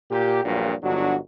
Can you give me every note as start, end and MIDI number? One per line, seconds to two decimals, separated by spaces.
0.11 0.43 46
0.11 0.43 67
0.45 0.73 34
0.45 0.73 40
0.45 0.73 43
0.45 0.73 46
0.45 0.73 54
0.83 1.17 31
0.83 1.17 44
0.83 1.17 54
0.83 1.17 62
0.83 1.17 66